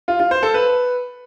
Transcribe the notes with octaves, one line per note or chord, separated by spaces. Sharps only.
F4
F4
C5
A4
B4